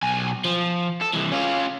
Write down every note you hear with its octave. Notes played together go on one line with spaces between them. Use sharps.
B1 G#5
F3
A4
C2 E3
C#4 F4